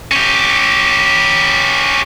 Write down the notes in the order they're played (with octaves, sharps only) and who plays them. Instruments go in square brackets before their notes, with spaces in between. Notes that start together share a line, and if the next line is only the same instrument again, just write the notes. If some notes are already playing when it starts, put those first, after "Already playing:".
[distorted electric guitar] C#4 G4